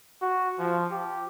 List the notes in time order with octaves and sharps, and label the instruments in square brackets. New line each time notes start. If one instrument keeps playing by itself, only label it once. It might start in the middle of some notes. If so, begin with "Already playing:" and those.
[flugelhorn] F#4
F3
G4